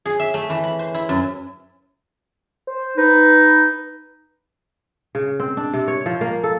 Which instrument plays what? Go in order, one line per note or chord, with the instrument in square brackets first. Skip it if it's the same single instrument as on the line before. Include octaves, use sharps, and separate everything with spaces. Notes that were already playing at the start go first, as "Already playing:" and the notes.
[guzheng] G#4
E5
A3
E3
B5
C5
E4
F#2
[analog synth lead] C5
[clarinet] D#4 [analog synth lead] B4
[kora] C#3
C4
D4
C3
C#5
F3
A#3
A4